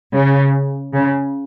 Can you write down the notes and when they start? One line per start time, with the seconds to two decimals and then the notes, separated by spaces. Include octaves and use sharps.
0.14 C#3
0.93 C#3